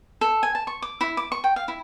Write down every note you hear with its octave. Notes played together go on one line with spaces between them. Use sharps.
A4
G#5
A5
C#6
D6
E4
D6
C#6
G5
F5
E4